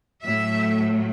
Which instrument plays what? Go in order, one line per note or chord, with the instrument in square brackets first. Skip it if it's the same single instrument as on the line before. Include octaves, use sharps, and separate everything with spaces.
[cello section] A2 F#3 A3 E5